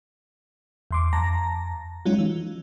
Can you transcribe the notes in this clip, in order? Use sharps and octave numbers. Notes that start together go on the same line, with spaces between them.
E2 C6 D6
F2 A5 A#5 A#6
F#3 G#3 C#4 D#4 F4
E3